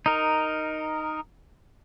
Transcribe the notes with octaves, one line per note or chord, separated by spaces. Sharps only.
D#4 A#4